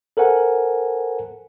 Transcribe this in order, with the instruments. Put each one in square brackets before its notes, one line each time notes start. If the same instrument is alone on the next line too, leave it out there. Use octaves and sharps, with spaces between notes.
[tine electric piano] A4 A#4 C5 F#5 G#5